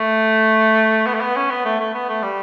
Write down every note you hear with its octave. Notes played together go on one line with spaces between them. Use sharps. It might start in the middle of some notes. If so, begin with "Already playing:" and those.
Already playing: A3
B3
A3
B3
C#4
B3
A3
A3
B3
A3
G3